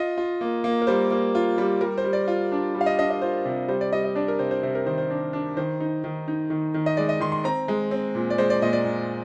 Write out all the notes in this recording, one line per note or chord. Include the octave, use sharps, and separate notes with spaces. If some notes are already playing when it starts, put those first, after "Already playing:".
Already playing: F4 D#5
F4
A#3
A#3
A#4
G3 C5
A#3
F4
G3
G3 A#4
C5
G3
D5
F4
D4
G3
F5
D#5
D4 D#5
D#5
F4 C5
C3
G3 C5
D5
G3 D#5
D#5
D4 D5
A#4
C3 C5
C5
C3 C5
A#4
D#3 C5
C5
D4
D4
D#3 C5
D#4
D#3
D#4
D#3
D#3
D#5
G#3 D5
D#5
D#3 C6
C6
C4 A#5
G#3
C4
A#2
D5
G#3 C5
D5
A#2 D#5
D5
A#2